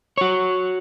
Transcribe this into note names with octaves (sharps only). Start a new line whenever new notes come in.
F#4 C#5